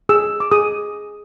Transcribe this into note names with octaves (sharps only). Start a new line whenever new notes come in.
G#4 E6
D6
G#4 D#6